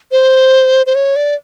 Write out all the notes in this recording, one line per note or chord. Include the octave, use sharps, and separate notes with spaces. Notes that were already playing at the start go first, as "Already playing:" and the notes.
C5
C5
C#5
D5